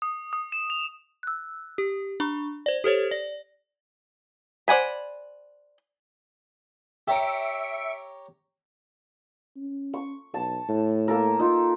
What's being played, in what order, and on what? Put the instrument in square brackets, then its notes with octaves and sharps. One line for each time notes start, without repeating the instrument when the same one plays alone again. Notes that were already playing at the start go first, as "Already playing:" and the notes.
[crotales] D#6
D#6
E7
F7
[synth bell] E6 F#6
G4
D4 B5 C#6
C5 D5
G4 A4 C5 C#5
D5
[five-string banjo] C5 D5 F#5 G#5 B5
[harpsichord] G4 C#5 A#5 [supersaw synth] E5 C#7 D7
[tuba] C#4
[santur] C#6
[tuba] B1 [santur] A5
[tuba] A2
[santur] A#3 A4 A#4
D#4 F4